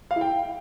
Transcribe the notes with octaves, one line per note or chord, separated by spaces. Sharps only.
F5
E4
G5